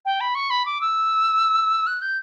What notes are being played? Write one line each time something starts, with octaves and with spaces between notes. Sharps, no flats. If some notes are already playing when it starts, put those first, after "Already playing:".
G5
B5
C#6
B5
D6
E6
F#6
G6